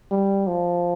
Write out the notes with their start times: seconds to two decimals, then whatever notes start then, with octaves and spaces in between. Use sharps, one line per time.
0.11 G3
0.47 F3